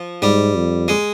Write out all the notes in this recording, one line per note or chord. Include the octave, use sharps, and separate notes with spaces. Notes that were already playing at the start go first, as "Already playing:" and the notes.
Already playing: F3
G#2 G3
F2
G#3